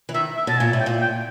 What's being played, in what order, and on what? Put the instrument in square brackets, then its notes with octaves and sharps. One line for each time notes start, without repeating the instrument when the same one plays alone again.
[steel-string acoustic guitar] E3
[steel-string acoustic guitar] D#3 [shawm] E5
[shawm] E5
[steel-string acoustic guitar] B2 [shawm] A5
[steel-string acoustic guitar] A#2 [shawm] G#5
[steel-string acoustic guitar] A2
[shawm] G5
[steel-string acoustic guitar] A#2
[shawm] G5